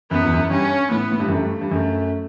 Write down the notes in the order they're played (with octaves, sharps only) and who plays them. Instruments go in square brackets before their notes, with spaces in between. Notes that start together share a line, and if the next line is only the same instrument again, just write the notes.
[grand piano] F#2 [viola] B3
[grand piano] E2
F#2
[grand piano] G2 [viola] C#4
[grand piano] A2 [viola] B3
[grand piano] A2
G2
F#2
[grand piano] G2 [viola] A3
[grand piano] G2
[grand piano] F#2 [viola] A3